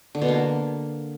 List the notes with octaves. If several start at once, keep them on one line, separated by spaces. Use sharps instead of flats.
D3
B2
A#3